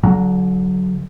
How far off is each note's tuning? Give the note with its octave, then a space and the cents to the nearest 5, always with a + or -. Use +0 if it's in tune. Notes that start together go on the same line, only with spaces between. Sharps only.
D3 -40 F#3 +0